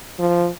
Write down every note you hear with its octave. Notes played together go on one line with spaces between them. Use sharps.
F3